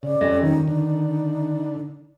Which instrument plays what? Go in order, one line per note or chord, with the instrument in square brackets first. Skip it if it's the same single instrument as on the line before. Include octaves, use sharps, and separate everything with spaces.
[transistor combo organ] C#3 [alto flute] D5
[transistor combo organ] F2 G3 C#4 [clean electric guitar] A4 D#5
[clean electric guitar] D#3 [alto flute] D#4
[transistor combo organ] D3 [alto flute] D#4